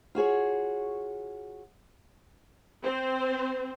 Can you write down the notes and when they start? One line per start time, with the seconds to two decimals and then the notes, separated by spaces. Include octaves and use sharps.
0.15 F4 F#4 G#4 C#5
2.83 C4 C5